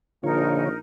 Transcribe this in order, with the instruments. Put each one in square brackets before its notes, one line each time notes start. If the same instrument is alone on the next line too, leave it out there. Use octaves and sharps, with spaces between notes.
[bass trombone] A#1 [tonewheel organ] D3 F4 C#5 [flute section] D#4 A#4